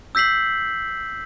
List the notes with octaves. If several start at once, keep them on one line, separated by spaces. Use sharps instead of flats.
E6 G6 B6 C7 F#7